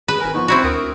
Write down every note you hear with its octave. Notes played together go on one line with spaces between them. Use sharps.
G#4 B4
G#1 A#4 G#5
F3 B3 D#4 C#6
C4 E4 F#4
D2 A#4 D#6 D7